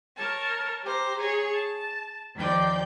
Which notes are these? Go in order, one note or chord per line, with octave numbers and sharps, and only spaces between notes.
A#4 C#5 A5
G4 C5 A#5
G#4 C#5
A5
D#2 F3 D5 G5 G6